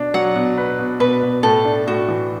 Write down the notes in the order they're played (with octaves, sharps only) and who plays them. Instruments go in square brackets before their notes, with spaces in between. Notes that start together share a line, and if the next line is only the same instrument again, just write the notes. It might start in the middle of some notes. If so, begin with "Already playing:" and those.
Already playing: [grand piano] B2 D4
[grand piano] F#3 [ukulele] F#5
[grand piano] B2
B4
B2
[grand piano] B2 [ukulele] B4
[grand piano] B2
[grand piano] A2 [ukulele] A4
[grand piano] D4
[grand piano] A2 [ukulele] F#4
[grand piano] E3